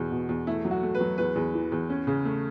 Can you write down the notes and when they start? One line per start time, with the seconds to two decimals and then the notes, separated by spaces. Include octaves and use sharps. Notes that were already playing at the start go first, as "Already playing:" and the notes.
Already playing: E2 B2
0.11 B2
0.29 E2
0.47 A3 E4
0.65 F#3
0.71 F#4
0.83 A3
0.95 B4
1.01 F#3
1.18 E2 B4
1.36 E2
1.54 E3
1.72 E2
1.90 C#4
2.07 C#3
2.25 A3